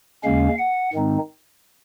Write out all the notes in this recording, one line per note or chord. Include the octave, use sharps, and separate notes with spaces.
D#2 C#3 G#3 C#4 F5
F#5
G#2 D#3 G#3 C4 D#4